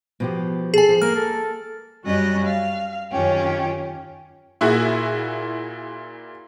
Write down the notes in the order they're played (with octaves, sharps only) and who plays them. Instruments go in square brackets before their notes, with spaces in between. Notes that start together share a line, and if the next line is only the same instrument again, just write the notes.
[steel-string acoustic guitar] B2 F3 G4
[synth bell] G#4 G#5 [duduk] A4
[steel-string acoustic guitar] F3
[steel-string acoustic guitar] A#3 [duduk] A#4 [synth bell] F6
[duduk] A4
[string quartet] F#2 G3 C#4 F#4 D#5 F#6
F5
F#2 D#3 C#4 F4 G4 C#5
[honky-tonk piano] A#2 E4 F#4 G#4